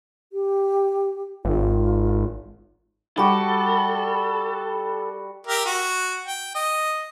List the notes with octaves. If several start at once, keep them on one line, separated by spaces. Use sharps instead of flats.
G4
G#1 F4
G3 F#4 A4
G4 A#4 E5
F#4
G5
D#5